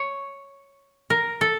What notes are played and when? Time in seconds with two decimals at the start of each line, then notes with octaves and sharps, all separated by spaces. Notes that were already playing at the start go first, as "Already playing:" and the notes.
Already playing: C#5
1.10 A#4
1.41 A4